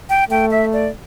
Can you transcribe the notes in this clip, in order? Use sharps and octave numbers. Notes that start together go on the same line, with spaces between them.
G5
A3 G5
E5
D5